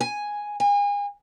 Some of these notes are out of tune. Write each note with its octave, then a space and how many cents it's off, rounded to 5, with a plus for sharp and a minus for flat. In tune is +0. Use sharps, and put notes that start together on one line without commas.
G#5 +0
G#5 -35